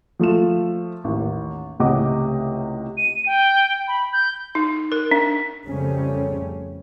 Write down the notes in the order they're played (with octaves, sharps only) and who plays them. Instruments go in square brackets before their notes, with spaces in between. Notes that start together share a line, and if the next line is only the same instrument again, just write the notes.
[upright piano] F3 A3 F4 E7
A1 D#2
C#2 A2 C3 D#5 F#5 D6
[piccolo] D#7
G5
B5
G6
[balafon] D#4
A#4
D4
[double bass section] F2 C#3 G3 A3 C4 C#4